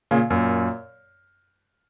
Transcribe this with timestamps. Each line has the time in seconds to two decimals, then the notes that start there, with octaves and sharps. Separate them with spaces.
0.11 A#2 C#3
0.30 F#2 A#2